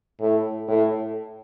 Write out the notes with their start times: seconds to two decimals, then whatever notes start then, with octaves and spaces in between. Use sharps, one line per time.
0.20 A2
0.68 A2